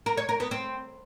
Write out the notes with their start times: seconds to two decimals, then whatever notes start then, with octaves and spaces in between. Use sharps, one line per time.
0.06 A#4
0.17 C#5
0.29 A#4
0.40 B3
0.51 C4